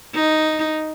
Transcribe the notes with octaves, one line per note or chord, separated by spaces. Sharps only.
D#4